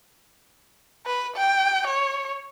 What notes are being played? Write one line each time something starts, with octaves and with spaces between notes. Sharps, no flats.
B4
G5
C#5